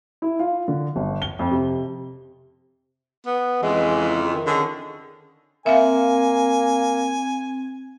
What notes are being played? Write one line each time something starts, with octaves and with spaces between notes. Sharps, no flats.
E4
F4
D3
G1
G7
F2
C3
B3
F2 C#3 E3 G#3
D#3
D3 C#4 G#4
A#3 C4 E5 F5 G#5